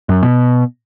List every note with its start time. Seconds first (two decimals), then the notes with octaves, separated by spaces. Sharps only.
0.09 F#2
0.23 B2